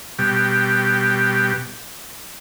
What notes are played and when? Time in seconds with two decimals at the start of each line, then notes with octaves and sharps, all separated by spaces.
0.19 B2 G3 G4